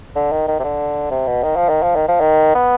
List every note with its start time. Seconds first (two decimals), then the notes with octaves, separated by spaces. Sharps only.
0.16 D3
0.32 D#3
0.48 D#3
0.60 C3
0.64 D3
1.11 C3
1.27 B2
1.43 D#3
1.56 F3
1.69 D#3
1.83 F3
1.96 D#3
2.08 F3
2.21 D#3
2.55 B3